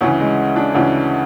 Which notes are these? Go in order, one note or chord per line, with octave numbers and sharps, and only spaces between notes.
D2 C#3 E3 C#4
G#3
D4
D2 C#3 E3